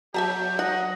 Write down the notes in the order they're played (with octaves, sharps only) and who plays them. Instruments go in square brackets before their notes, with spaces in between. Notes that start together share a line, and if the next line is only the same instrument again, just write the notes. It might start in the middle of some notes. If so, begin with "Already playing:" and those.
[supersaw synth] F#3 [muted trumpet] G4 [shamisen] E5 A5 A#5
[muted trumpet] D#5 [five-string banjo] F#5